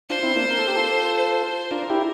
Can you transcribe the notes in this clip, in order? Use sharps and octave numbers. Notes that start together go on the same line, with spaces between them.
D4 F4 C5
C4 E4
A#3 D4
A#4
A4
G4
F4 A4
C5
D4 F4 A#4
E4 G4